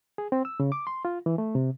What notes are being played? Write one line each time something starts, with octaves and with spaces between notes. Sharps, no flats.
G#4
C4
E6
C#3
D6
C6
F4
E3
A3
C3